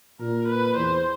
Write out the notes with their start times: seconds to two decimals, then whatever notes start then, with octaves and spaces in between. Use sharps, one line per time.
0.20 A#2 A#4
0.48 B4
0.77 E2 C5